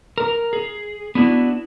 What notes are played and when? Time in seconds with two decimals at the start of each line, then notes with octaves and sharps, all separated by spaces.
0.18 A#4
0.53 G#4
1.15 B3 D4 E4 F#4